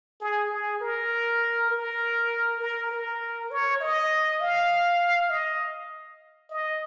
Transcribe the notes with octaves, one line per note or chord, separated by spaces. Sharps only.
G#4
G#4
A#4
A#4
A#4
A#4
C#5
D#5
F5
D#5
D#5